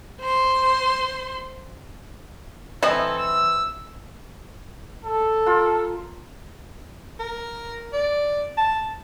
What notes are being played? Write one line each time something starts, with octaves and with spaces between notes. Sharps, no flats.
C5 C6
E3 C4 E4 A4 D#5
E6
A4
F4 A#4
A#4
D5
A5